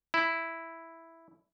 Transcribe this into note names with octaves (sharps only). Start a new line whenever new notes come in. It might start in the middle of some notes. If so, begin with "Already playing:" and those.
E4